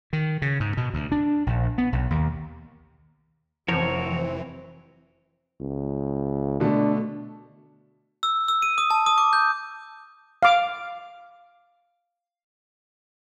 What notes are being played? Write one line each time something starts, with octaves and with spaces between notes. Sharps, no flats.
D#3
C#3
G#2
B2
D2
D4
A#1
B3
B1
D#2
F1 E3 F3 C4 F#4 A#4 C#5
C#2
B2 D3 A3 D4
E6
E6
D#7
D#6
A5
D#6
D6
G6
F5 D6